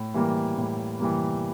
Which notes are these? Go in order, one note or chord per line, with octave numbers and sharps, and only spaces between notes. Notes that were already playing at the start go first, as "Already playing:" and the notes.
Already playing: A2
E3 G3 A#3
A2
E3 G3 A#3